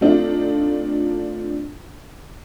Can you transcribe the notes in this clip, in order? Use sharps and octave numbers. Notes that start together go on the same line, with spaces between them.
A3 C4 D4 D#4 F4